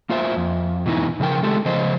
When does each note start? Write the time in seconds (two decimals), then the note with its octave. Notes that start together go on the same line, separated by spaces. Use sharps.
0.09 A#3 F4 C5 E5
0.36 F2
0.86 B2 E3 C4 D#4 E4
1.20 C#3 F3 A#4 G5
1.43 G#3 A3 G4 A4
1.65 C#3 F3 C5 D#5